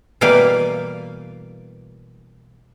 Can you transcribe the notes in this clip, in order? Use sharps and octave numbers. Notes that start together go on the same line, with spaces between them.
B2 E3 G3 A#3 D5 F5